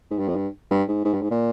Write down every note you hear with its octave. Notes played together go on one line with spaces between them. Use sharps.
G#2
G2
F2
G2
G2
G#2
G#2
G2
G#2
A#2